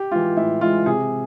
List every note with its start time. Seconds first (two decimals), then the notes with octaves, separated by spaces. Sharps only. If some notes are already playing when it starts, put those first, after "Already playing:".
Already playing: G4
0.11 E3 G#3 F4
0.37 A2 E4
0.61 E3 G#3 F4
0.86 C3 G#4